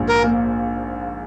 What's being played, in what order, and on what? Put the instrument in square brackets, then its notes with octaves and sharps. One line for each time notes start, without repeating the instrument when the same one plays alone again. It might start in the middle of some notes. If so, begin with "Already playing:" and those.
Already playing: [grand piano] A#1 G#2
[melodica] A#4
[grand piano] A#3